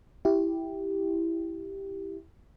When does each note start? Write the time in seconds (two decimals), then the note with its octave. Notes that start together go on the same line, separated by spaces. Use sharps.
0.25 E4 G4